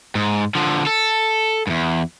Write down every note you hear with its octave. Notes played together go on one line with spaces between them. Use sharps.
G#2
D3 F3
A4
E2 G2